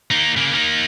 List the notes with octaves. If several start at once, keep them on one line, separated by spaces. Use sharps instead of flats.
A#3 D#4
C#3 A#3
A#3 D#4